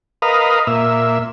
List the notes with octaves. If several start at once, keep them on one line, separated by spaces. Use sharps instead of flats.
A#4 B4 D#5 F5
A#2 E5